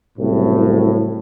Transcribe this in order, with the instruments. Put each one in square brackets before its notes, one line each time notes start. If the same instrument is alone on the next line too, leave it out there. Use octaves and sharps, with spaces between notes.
[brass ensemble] F#1 C2 A2